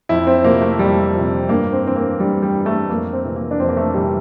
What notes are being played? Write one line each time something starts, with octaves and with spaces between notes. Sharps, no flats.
F2 E4
C4
C3 F3 A#3
A3
F2 G3
C3 F3
G2 A#3
C4
E3 C4
A#3
G2 G3
G3
E3
A3
F2 A#3
C4
C3 E3
A#3
D4
F2 C4
A#3
A3
C3 E3 G3